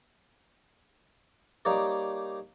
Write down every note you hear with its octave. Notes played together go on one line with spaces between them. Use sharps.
G3 A#3 D#4 C#5 D5